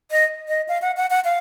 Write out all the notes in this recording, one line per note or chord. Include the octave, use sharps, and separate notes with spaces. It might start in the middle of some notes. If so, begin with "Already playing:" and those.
D#5
D#5
F5
F#5
F#5
F#5
F5